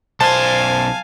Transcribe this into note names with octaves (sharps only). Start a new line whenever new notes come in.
B1 C5 F5 G#5 A5